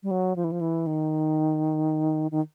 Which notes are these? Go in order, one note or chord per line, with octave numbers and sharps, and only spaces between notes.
G3
F#3
F3
E3
F3
E3
D#3
D#3